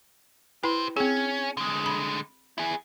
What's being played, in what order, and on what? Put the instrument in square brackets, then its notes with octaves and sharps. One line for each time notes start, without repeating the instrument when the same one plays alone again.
[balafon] E4 B4 [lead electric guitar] G4 C5
[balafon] C4 G#4 [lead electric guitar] C#4
[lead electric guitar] D3 G#3
[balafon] B5
[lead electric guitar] E4 G#4